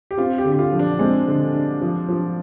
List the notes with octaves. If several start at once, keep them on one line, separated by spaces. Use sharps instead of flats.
G4
C4 F4
G4
D3
G4
F4
F3
D4
G#3 C4
D3
D4
F3
F3